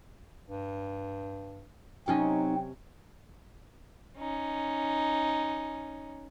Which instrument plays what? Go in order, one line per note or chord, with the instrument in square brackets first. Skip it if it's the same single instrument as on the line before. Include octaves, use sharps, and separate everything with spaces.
[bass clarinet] G2
[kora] C3 C#4 D#5 [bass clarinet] F#3 [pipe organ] C4 [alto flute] D#4
[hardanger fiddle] C#4 D#4